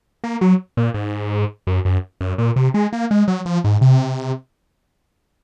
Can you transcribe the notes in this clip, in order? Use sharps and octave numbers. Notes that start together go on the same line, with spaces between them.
A#3
F#3
A#2
G#2
F#2
F#2
F#2
A#2
C3
G#3
A#3
G#3
F#3
F3
G#2
C3